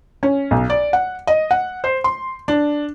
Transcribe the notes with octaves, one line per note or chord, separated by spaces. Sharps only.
C#4
B1
D5
F#5
D#5
F#5
C5
C6
D4